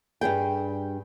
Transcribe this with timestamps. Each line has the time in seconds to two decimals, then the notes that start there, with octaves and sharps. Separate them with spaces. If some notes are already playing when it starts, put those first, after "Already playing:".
0.21 G2 G3 G#4 G5